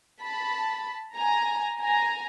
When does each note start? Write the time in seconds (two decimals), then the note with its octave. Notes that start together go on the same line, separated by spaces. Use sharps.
0.23 A5 B5
1.17 G#5 A#5
1.81 G#5 A#5